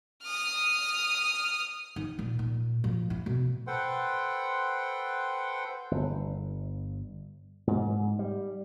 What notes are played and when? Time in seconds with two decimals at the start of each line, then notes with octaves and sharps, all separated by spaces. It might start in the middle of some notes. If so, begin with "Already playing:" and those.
0.23 D#6 F6
1.96 D#3
2.19 A#2
2.39 A#2
2.84 F3
3.10 E4
3.26 B2
3.67 A4 B4 C5 F#5 G5 C6
5.91 G1
7.67 G#2
8.19 G3